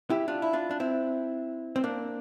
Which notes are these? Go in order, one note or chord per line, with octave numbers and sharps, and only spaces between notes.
E4 G4
D4 F4
E4
D4 F4
D4
C4 E4
C4
A#3 D4